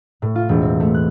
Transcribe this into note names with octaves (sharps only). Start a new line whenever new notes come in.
A2
F4
E1
C4
A3
F#6